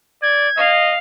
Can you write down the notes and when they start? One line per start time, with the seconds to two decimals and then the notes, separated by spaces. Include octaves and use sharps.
0.22 D5 G#6
0.58 D#5 F5